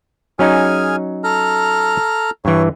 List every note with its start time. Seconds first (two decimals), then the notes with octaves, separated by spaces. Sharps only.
0.39 F#3 C#4 D#4 G#4 G#5 F6
1.24 A4 A#5 F6
2.45 G2 E3 C#5